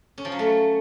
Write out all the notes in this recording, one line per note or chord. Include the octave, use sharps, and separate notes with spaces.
C#4
F3
F#3
A3